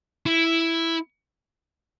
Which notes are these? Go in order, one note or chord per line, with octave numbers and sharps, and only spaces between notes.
E4